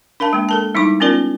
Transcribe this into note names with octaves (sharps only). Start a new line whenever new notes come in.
D4 A#4 F5 A5
G#3 A#3
A4 A#4 A5
G3 D#4 E4 D6
B3 C#4 F4 A#4 D5